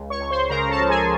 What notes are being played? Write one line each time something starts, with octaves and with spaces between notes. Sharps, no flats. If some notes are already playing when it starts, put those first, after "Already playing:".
Already playing: C#2
C#5 C#6
C#2
C5 C6
C#3 A#4 A#5
A4 A5
F3
G#4 G#5